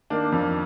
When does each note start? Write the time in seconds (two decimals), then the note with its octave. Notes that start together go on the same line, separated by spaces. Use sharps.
0.10 D#3 A#3 D4
0.32 F2